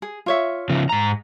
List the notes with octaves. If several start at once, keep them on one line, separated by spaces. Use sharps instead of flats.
G#4
F4 C#5 E5
C#3 F3
G#2 A#5